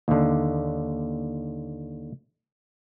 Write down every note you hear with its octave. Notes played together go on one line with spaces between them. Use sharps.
D#2 D3